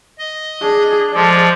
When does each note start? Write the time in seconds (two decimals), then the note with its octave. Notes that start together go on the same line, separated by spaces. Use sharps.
0.19 D#5
0.62 D4 G#4
1.14 F3 G#3 A4 D5